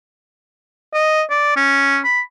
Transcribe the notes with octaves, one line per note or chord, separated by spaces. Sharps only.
D#5
D5
C#4
B5